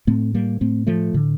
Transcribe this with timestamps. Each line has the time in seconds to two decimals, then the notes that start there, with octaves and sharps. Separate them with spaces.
0.07 A2 A3 C4
0.34 G3 A#3
0.61 A2 A3 C4
0.87 F3 A3
1.14 A2 D3